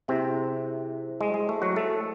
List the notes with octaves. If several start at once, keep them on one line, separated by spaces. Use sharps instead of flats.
C3 C4 E4 G#4 C5 E5
G#3
G#3
A3
F#3 F#4
A3 A4